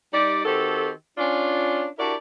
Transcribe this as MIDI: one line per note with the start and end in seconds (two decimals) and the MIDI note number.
0.13 0.43 55
0.13 0.43 63
0.13 0.43 67
0.13 0.43 74
0.45 0.90 51
0.45 0.90 60
0.45 0.90 66
0.45 0.90 67
0.45 0.90 69
1.18 1.87 61
1.18 1.87 62
1.18 1.87 65
1.99 2.14 62
1.99 2.14 64
1.99 2.14 66
1.99 2.14 67
1.99 2.14 70
1.99 2.14 74